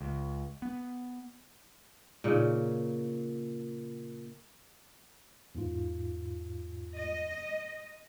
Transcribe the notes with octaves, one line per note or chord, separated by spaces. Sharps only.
C#2
B3
A#2 C#3 D#4
E2 G#2 F4
D#5